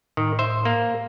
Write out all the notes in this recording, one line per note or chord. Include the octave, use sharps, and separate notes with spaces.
A2 D#3
C5 E5
A#3